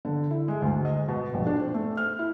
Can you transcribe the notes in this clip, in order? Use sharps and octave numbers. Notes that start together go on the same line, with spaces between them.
D3
E4
G#3
D2
D#5
B2
A#1
D4
C4
A3
F6
E4